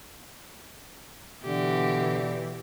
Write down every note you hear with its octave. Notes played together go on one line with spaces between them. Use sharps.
B2 D3 E3 G4